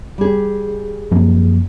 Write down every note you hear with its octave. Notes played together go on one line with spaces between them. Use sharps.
G3 G#4
F#2 F3 A#3